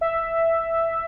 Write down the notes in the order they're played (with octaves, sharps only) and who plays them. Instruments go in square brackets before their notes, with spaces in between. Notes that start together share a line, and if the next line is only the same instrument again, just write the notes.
[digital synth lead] E5